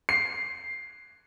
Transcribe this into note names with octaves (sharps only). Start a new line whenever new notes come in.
C7